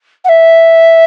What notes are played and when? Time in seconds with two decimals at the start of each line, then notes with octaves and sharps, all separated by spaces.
0.24 F#5
0.29 E5